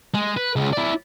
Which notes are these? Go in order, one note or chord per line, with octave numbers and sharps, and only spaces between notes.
G#3
B4
C#2 C#3
E4 D5